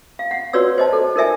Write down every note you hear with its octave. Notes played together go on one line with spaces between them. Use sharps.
F5
F#5
F#4 B4 C#5 D5 E6
C5 D#5 A5
A4
D#4 A#4 D5 E5 G#5